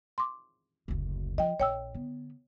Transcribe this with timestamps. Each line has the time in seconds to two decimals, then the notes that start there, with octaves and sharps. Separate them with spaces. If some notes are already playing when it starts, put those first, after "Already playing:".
0.18 C6 D6
0.88 F#1 D2
1.38 F3 D#5 G5
1.60 A#1 C#5 G5 E6
1.94 D3 B3